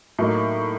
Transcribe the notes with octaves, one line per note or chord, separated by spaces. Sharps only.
A2 F#3 A#3 D#4